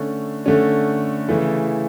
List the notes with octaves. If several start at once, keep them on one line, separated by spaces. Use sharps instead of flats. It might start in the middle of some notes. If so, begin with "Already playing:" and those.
Already playing: D3 A3 C#4
D3 A3 C#4
C#3 E3 A3 E4 A4